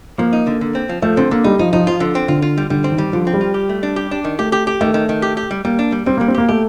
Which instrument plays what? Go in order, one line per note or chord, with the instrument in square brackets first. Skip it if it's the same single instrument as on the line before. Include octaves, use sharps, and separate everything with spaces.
[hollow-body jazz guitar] F3 [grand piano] A#3
[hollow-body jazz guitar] D#4
D3
D3
C4
F3
[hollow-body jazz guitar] F3 [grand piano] A3
[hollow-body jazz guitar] D3 [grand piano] C4
[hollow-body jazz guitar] D3 [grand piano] A#3
[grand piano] G3 [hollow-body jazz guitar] D#4
[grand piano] F3 [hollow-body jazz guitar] D#4
[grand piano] F3 [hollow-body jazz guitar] D#4
[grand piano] F3 [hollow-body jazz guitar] F4
[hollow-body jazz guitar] D3
C4
[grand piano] D3 [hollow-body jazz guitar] F4
[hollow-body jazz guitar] F4
G3
[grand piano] D3 [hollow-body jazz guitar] G3
[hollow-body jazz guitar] C4
[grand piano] D#3
[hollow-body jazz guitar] G3
[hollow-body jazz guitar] D3 [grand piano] F3
[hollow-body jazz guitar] C4
[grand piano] G3
[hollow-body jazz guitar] F4
G4
A3
D4
G4
D4
D#3
[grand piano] A3 [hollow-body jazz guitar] G4
[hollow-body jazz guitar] G4
G4
[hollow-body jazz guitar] D#3 [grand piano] A3
[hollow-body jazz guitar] D#3
D#3
G4
G4
G3
[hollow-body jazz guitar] G3 [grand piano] A#3
[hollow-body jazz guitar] D4
G3
[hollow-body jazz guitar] G3 [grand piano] C4
[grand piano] A#3
[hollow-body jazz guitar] G3
[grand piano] C4
[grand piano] A#3 [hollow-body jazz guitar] G4
[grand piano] A3 [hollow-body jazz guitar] G4